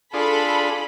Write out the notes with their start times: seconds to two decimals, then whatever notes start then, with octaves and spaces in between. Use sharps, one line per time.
0.13 D4 F4 G#4 A4 B5